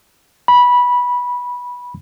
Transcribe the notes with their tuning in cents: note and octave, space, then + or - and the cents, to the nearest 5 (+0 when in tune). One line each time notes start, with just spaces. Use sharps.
B5 -15